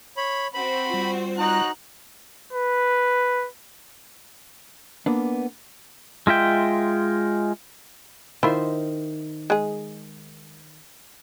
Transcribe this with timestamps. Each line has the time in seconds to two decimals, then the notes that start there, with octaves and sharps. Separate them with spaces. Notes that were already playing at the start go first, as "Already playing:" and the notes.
0.17 C#5 B5
0.54 C4 F#4 C5 B5
0.90 G3 F4
1.39 D#4 F#4 A#5 F#6
2.53 B4
5.06 A#3 B3 D4
6.27 G#3 F4 E5 G5
8.43 D#3 E4 F4 C5 E5
9.50 G#3 G#4